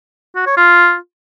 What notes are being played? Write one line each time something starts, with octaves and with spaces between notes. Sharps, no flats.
F#4
C#5
F4